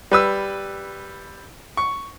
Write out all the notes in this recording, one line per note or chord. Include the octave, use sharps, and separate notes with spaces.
G3 B4 E6
C#6